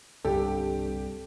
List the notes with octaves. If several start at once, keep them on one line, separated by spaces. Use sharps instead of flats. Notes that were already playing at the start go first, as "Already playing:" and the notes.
C2 G2 D3 G4 A4